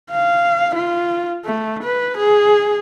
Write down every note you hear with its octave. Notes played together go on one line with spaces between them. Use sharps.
F5
F4
A3
B4
G#4